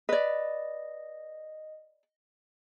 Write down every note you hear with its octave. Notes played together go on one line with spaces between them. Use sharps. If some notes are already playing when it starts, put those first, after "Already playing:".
B4 D5 D#5